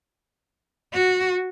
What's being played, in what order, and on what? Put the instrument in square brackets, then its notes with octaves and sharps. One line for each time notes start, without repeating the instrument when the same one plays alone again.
[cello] F#4